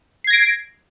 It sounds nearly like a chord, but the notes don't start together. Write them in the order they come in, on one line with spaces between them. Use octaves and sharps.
C7 G#6 A#6 D7